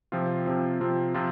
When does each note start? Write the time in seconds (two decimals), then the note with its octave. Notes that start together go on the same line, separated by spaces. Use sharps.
0.12 C3 F3 C4 F4
0.46 C3 F3 C4 F4
0.81 C3 F3 C4 F4
1.14 C3 F3 C4 F4